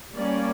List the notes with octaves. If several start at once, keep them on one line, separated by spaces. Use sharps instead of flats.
G3 A#3 C#4 D5